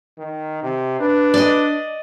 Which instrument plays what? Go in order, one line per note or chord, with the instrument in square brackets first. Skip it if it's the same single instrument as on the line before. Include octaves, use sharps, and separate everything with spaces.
[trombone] D#3
C3
[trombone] D4 [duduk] B4
[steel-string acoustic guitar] D5 D#5